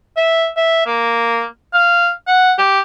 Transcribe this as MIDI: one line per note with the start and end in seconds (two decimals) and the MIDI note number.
0.17 0.49 76
0.57 0.82 76
0.86 1.46 58
1.73 2.10 77
2.28 2.53 78
2.58 2.80 67